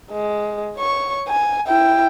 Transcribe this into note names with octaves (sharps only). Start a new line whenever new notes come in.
G#3
C#5 C#6
G#5
E4 G5